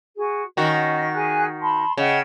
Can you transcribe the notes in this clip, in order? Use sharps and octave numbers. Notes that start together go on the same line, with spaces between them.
F#4 G#4
D#3 C#4 F#4 D#5
G#4 G#5 F#6
A5 B5 C6
C#3 D#5 F#5 G5